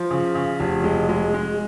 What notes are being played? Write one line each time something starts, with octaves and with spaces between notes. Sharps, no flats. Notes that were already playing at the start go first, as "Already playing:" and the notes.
Already playing: F3
C#3
C#3
F1
G#3
G#3
G#3